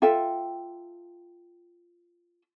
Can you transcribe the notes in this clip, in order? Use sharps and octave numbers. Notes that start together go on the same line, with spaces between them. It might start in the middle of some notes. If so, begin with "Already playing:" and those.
F4 A4 E5 G5